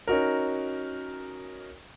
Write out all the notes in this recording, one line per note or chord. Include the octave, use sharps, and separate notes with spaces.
C#4 D#4 F#4 A#4